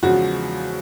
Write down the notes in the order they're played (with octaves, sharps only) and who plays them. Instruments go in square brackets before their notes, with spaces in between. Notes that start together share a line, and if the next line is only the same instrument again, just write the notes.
[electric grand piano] E2 C#3 F3 G#3 [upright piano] F#4